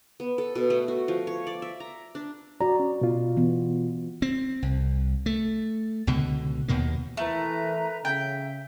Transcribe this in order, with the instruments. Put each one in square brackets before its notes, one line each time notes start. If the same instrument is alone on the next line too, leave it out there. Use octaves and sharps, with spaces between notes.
[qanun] B3
A4
B2
A3
F#4
F3
C#5
D5
E5
A#5
D4
[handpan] F#4 D5 [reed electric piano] A#5
[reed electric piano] C#4
B2 F4
[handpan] E3 B3
[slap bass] C4
C2
A3
C#2 B2 D3
D#2 B2 D#3 A#3
[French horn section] E3 [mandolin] A3 [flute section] A#4 B4 A#5
[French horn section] C#3 [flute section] E5 [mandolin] G5